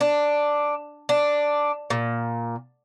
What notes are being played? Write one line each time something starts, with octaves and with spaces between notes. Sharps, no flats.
D4
D4
A#2